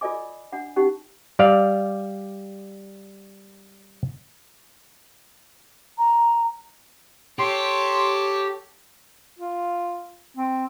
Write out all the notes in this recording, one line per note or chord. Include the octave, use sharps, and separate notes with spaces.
F4 A4 D5 D#5 G#5 D6
D4 F#5
C#4 D#4 G4 F#5
G3 D5 F5
A#5
G4 A4 C#5 C6
F4
C4